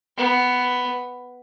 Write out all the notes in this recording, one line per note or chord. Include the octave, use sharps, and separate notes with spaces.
B3